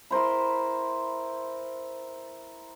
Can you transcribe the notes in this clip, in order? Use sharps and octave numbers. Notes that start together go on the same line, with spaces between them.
E4 A#4 C5 B5